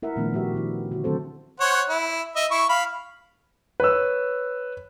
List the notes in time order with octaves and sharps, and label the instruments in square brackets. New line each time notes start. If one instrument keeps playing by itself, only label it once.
[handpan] E4 A#4 E5 F#5
A#2 D#3 F3 A3 B3 D4
F3 F#4 G4 E5
D#3 D4 E4
D3 F#4
D3 D#3 F#3 C4 A4 C5
[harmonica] C5 C#5 F#5
E4
D#5 E5
E4 C#6
F5 B5
[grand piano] B4 C#5 E6